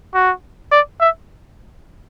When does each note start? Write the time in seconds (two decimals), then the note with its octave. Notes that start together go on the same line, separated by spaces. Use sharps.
0.14 F#4
0.72 D5
1.00 E5